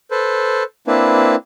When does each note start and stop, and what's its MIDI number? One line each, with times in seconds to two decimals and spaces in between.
0.11 0.63 69
0.11 0.63 71
0.11 0.63 72
0.87 1.35 58
0.87 1.35 60
0.87 1.35 62
0.87 1.35 64
0.87 1.35 71